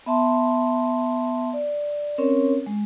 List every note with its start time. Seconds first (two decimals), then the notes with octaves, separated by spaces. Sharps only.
0.06 B3 E5 A5 C6
1.53 D5
2.18 C4 C#4 A#4 C#5
2.66 G#3